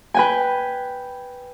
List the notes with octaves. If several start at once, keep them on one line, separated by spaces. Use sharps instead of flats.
B4 G5 G#5